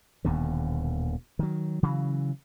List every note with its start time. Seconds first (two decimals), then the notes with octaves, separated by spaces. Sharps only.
0.25 D#1 D#2 B2 D3
1.39 D#3 F#3
1.83 C#3 E3 F#3